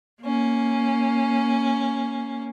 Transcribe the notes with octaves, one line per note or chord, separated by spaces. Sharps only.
A#3 C#4